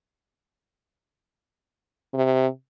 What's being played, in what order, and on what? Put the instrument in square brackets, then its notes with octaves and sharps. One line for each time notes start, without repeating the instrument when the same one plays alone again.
[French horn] C3